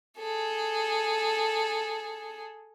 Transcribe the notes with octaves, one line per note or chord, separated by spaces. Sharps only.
G#4 A4